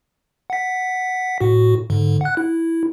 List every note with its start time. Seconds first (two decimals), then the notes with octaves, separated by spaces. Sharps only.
0.50 F#5 B6
1.41 A2 F#4
1.90 G#2 D3
2.21 F#5 F#6
2.37 E4